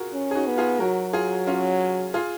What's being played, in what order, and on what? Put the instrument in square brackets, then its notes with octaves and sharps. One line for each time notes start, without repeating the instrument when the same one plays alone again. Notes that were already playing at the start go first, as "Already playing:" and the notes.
Already playing: [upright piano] F4 F#4 G#4 A#4
[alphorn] C#4
[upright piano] G#4
D#4 F#4
[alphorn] B3
[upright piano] F4 G#4
[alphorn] F#3 [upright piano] F#4 A#4
[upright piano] F4 G#4
C#4 F4
F4 G#4